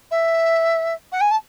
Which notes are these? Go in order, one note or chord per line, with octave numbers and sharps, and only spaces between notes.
E5
F#5
G#5
A5